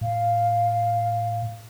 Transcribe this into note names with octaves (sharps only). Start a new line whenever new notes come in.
A2 F5